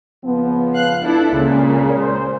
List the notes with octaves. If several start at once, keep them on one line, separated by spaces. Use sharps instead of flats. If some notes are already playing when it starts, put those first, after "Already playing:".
C#2 F3 B3
F5 F#6
D4 E4 A4
C#2 A#2 C#3
C5